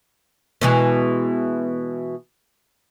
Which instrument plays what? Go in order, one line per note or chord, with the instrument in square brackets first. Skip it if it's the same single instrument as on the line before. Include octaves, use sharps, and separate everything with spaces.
[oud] B2 E3 G#3